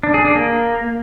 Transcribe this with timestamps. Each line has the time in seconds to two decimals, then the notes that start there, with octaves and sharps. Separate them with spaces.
0.03 D4
0.14 G#4
0.25 D4
0.35 A#3